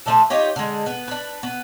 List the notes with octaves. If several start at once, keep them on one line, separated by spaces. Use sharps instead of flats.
F3 A3 D4 A4
D#4 F4 G4 C#5
D3 G#3
B3
D4 B4
B3